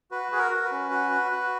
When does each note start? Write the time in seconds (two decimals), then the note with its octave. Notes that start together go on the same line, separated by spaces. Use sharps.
0.11 F#4 B4
0.32 F#4 G#4
0.39 A#4
0.51 F#4
0.65 B4
0.72 C#4
0.91 F#4
1.11 F#4
1.32 F#4